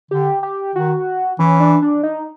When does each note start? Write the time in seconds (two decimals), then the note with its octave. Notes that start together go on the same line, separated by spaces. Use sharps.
0.11 D3 G4
0.43 G4
0.75 D#3 F#4
1.39 E3 C#4
1.60 D4
1.82 D4
2.03 D#4